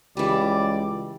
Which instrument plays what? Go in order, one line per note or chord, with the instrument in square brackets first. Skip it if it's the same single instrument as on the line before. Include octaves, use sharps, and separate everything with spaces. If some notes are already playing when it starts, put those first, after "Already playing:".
[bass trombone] C#2 [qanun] E3 G3 [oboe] D5